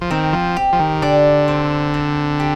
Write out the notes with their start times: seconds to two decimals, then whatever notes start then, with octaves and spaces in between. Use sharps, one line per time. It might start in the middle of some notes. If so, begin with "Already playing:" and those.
0.01 F3
0.11 D#3 C4
0.33 F3
0.56 G4
0.73 F3
0.79 D#3
1.02 D3 D5
1.48 C4
1.94 C4
2.40 G4